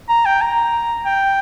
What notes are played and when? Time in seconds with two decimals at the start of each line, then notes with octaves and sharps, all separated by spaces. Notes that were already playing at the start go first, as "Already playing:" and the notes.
0.09 A#5
0.25 G5
0.41 A#5
1.05 G5